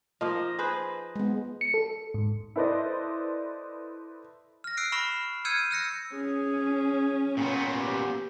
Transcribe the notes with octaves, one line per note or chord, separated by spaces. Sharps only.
F3 A#3 D#5
G#4 B4 C5
G#3 B3
C#7
A4
G#2
E4 A4 B4 C5 D5 D#5
F6 A#6
E6 F#6 C7 D7
B5 C#6 F6 A#6 E7
E6 F6 G6 G#6 C#7 D#7
E6 F#6 A#6 C#7
C#4 G#4
A#2 B3 G5 C#6
G4